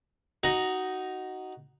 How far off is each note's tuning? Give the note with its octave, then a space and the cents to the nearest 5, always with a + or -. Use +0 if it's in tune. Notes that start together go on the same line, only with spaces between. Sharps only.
D#4 +0 F#4 +10